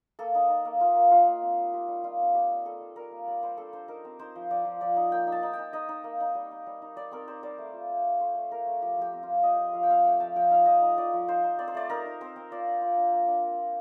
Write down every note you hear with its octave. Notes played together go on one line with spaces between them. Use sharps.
A#3 A4
D#4
D#4
A#3
A#3 F4
A#3
A#3 F4
A#3
C4
G3
C4 G4
G3
G3 F4
C4
G3 G4
D#4
G3 A4
G3
G3 A#4
A#3
G3 D5
G3 C5
D4 A4
D4 C5
D#4 A#4
C4
D#4 C5
F3
F3 D5
F3
F3 D5
D#4
A#3 G5
D#4
A5
D#4
G5
D#4
D#4 D#5
D#4
A#3
D#4
G3
D#4
G3
D#4
G3 D5
C4 A#4
G3 C5
G3 D5
A3
F4
F4
A3
A3 C5
A3
F4 A#4
A3
F3 G4
F3 G4
C4
C4 F4
F4 D#5
F3
F3 F5
G5
C4 F5
A3 G5
F3 A5
F3 G5
D#4 F5
F3 D#5
D#4
F3 D5
F3
D#4 C5
D#4
C4 D5
C5
A3 D5
D#4 A#4
D#4
C4 C5
C4
F4 D5
D4
F4
D4
A#3
D4
A#3
F4